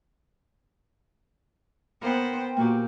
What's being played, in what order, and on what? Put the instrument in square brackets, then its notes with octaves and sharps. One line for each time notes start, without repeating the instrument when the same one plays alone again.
[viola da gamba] B3 C5 [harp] A#4 [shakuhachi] G5
[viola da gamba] A#2 [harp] A#3 F#4 G4